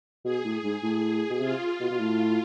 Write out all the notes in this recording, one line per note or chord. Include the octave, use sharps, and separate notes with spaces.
B2 G#4
A2
G#2
A2
B2
C3 F4
B2
B2
A2